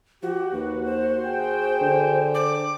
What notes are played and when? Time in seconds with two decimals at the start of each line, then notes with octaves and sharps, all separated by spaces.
0.23 F3 F#4 G4
0.53 D#2 B4
0.84 C5
1.25 G#4 G5
1.81 D3
2.34 D6